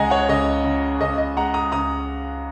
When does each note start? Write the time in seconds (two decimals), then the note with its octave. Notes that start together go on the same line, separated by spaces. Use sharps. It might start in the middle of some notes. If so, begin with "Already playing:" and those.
Already playing: C#2 G#3 D#5 F#5 G#5 A#5
0.10 C#5 F#5
0.29 C#2 D#5
0.64 C#3
1.00 C#2 D#5
1.18 D#5
1.37 G#3 F#5 A#5
1.54 A#5 D#6
1.72 C#2 A#5 D#6